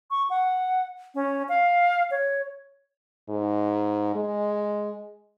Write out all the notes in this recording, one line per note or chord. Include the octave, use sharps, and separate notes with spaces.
C#6
F#5
C#4
F5
C#5
G#2
G#3